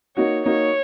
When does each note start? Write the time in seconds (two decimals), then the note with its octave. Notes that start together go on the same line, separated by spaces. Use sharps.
0.17 A#3 D#4 F#4 C#5
0.46 A#3 D#4 F#4 C#5